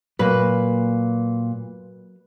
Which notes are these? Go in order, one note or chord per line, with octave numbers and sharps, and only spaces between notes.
A#2 F#3 A#3 B4